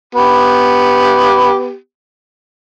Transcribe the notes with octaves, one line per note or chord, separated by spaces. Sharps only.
B3 G4